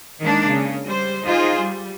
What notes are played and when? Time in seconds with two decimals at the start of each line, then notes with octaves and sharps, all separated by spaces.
0.20 D#3 G#3 A#3 D4
0.50 C#3
0.86 G3 C5
1.24 D#4 F4 G#4 C5
1.60 G3